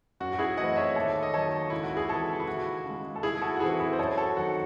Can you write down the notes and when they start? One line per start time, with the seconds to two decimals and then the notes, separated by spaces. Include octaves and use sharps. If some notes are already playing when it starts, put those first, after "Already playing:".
0.20 F#2 F#4
0.33 F#4
0.38 E4 G#4
0.57 E3 A3 C4 D#5 F#5
0.76 C#5 E5
0.96 D#2 A4 C#5
1.23 D#5
1.34 D#3 F#3 A4 C#5
1.70 C#2 E4
1.83 F#4
1.97 G#4
2.09 C3 E3 F#4 A4
2.40 E4
2.47 D#2 F#4
2.85 C#3 G#3
3.16 A4
3.23 C2 E4 G#4
3.42 F#4 A4
3.56 F#4
3.60 C3 E3 C4 E4 G#4
3.80 E4 G#4
3.93 C5
3.99 F#2 A4 C#5
4.17 F#4 A4
4.37 D#3 F#3 C4 F#4